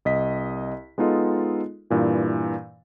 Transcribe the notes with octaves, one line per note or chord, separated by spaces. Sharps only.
C2 D#5 B6
G#3 B3 D#4 F4 A4 D#5
G2 A#2 E3